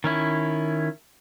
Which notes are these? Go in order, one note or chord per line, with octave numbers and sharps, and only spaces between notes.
D#3 C#4 E4